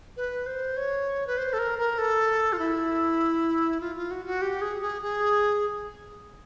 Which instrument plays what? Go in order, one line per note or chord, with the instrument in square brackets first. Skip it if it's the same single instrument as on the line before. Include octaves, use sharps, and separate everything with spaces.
[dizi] B4
C5
C#5
B4
C5
A4
A#4
A#4
A4
F4
E4
F4
F4
F#4
F#4
G4
G#4
G#4
G#4